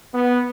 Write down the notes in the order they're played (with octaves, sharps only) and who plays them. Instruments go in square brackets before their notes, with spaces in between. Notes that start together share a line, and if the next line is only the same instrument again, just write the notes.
[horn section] B3